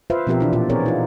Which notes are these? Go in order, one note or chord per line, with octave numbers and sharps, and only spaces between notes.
F4 B4 C5 E5 F5
B2 F3 C4 G4 A#4 E5
E3 D4 E4
A#2 F4 D5
B3 C4 G#4 A#4 C#5 D5
D#4 F4